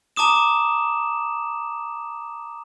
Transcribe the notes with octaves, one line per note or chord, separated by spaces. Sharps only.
A5 A#5 D6 D#6 E7